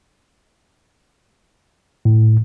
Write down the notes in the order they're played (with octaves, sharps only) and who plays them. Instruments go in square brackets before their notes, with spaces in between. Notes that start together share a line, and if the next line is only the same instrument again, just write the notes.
[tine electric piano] A2